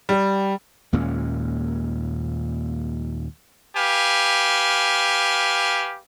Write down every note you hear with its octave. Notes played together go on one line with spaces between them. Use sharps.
G3
D#2 A#2 G#3 C#4
G4 B4 F5 G#5